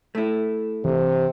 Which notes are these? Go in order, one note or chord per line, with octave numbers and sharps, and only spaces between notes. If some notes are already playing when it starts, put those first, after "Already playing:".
A3 E4
C3 E3